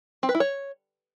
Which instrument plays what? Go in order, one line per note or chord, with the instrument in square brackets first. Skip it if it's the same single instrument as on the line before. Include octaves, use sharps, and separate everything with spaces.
[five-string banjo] C4
B4
E4
C#5